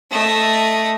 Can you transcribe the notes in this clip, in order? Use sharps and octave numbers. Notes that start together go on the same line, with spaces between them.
A3 D#5